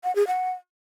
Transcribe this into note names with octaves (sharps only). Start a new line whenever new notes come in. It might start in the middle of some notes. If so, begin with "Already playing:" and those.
F#5
G#4
F#5